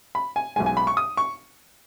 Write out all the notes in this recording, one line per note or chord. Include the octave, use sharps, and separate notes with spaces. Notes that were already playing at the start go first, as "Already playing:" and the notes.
B5
G#5
B1 B2 G#3 G#5
G#5
B5
C#6
D#6
C#6